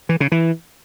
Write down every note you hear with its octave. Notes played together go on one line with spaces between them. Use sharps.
E3
C#3
E3